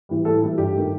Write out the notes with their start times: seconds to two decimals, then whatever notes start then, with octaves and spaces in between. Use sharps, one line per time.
0.09 E3 G3
0.25 A2 A4
0.41 E3 G3
0.58 G2 G4
0.75 D#3 A3